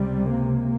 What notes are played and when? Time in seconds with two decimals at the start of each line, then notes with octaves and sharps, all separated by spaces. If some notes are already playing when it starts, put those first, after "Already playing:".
Already playing: C#2 C3 G3
0.32 A#3